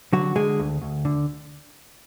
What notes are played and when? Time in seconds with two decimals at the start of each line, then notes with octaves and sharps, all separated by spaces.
0.13 D3 F#3 F#4
0.36 D3 G#3 G#4
0.59 D2
0.82 D2
1.05 D3